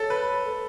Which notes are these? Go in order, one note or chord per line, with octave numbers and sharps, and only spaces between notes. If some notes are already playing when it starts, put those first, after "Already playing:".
Already playing: A4 C#5
B4
A4